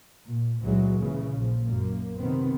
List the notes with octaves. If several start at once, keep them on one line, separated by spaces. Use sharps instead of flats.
A#2
C#2 A#2 E3 F#3 G#3
A#2 C#3 E3
A#1 F3
F#2 A#3
C3 D#3 B3 C4